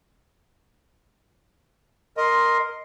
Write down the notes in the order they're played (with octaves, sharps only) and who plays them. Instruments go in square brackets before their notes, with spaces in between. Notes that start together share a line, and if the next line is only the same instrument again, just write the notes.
[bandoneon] A#4 D#5 [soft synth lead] C6